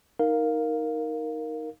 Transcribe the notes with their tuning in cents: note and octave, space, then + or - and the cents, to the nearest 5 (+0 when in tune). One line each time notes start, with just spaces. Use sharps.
D#4 +5 A#4 +0 F5 +0